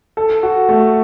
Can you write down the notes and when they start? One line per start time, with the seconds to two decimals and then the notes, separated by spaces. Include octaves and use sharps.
0.17 A4
0.43 F#4
0.69 A3